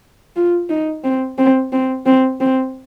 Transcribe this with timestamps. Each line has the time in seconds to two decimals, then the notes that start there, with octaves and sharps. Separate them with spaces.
0.36 F4
0.69 D#4
1.04 C4
1.38 C4
1.73 C4
2.06 C4
2.40 C4